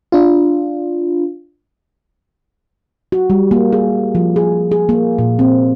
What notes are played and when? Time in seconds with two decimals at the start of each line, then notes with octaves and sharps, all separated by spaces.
0.12 D4 F4
3.12 F#4
3.30 G3
3.51 A#3
3.72 G#4
4.15 F3
4.36 G#4
4.71 G#4
4.89 A#3
5.19 A#2
5.39 C4